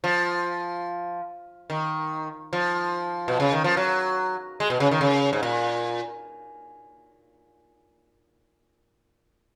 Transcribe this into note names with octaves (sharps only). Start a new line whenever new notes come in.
F3
D#3
F3
B2
C#3
D#3
F3
F#3
G#3
B2
C#3
D#3
C#3
G#2
A#2